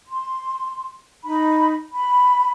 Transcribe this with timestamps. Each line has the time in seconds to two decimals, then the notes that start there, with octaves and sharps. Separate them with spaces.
0.08 C6
1.24 D#4 B5
1.94 B5